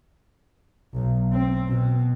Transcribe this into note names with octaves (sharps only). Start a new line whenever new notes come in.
B1
C4
B2